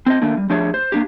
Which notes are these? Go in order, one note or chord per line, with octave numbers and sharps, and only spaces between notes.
C4 C5 D#5
D#3 A3 A#3 D4
G3
F3 A3 D4 G4 G#4 C#5
C5
A#3 D4 G4